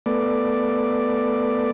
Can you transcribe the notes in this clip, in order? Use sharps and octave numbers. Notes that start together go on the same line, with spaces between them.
A3 B3 D5